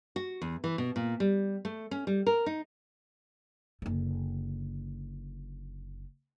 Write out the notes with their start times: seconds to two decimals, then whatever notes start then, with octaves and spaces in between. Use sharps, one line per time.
0.16 F#4
0.42 E2
0.64 E3
0.78 B2
0.96 A#2
1.20 G3
1.65 A3
1.91 C#4
2.07 G3
2.27 A#4
2.46 D#4
3.82 F#1 D3